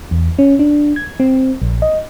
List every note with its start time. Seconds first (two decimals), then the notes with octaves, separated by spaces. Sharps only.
0.11 E2
0.39 C#4
0.59 D4
0.96 G#6
1.20 C4
1.62 A#1
1.82 D#5